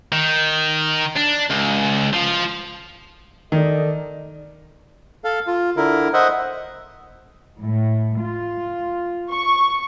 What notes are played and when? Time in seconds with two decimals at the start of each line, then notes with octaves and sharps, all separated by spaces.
0.12 D#3
1.17 D4
1.50 C#2
2.13 F3 F4
3.52 D#3 A4 D5 D#5
5.24 A4 F5
5.47 F4
5.77 D3 E4 A#4
6.13 C5 D#5 E5 F#5
7.64 A2
8.23 F4
9.32 C#6